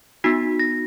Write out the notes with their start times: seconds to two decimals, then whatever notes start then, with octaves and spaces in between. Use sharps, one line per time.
0.24 B3 D#4 F#4 B6
0.60 A#6